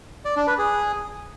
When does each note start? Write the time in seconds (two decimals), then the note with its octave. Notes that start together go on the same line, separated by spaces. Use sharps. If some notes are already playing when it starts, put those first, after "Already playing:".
0.25 D5
0.36 D4
0.47 B4
0.58 G#4